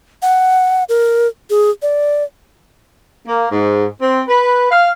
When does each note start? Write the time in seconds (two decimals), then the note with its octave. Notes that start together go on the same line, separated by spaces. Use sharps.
0.22 F#5
0.89 A#4
1.50 G#4
1.82 D5
3.27 A#3
3.51 G#2
4.00 C4
4.28 B4
4.71 F5